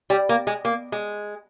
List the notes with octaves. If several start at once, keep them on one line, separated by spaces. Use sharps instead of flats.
G3
A#3
G#3
A#3
G#3